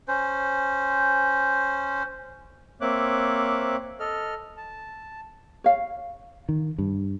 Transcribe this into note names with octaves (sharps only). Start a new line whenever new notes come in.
C#4 C5
A#3 C4 C#5 E5 D6 F#6
A4 D#5 F6
A5
C#5 F5
D#3
G2